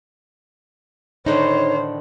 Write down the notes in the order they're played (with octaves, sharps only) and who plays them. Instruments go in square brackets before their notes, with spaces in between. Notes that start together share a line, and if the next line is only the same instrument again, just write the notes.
[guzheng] A2 D3 D#3 [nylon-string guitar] D#4 [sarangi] C5 [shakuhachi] C#5